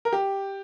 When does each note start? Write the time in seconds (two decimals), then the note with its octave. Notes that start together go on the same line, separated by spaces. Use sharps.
0.05 A#4
0.13 G4